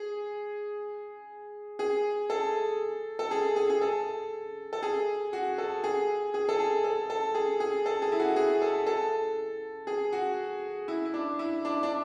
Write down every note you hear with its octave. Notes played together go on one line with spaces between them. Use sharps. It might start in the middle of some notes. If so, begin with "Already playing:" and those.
Already playing: G#4
G#4
A4
A4
G#4
G#4
G#4
A4
A4
G#4
F#4
A4
G#4
G#4
A4
G#4
A4
A4
G#4
G#4
A4
G#4
E4
F#4
G#4
A4
A4
G#4
F#4
E4
E4
D4
E4
D4
D4